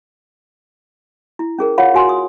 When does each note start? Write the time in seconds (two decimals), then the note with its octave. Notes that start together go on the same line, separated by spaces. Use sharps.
1.39 E4
1.58 C#4 G#4 A#4
1.78 F4 C#5 F5 F#5 B5
1.94 F#4 G#5 C6
2.09 D#6